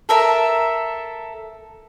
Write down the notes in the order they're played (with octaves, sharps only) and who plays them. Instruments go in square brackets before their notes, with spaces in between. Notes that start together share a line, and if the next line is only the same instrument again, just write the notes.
[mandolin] A4 A#4 E5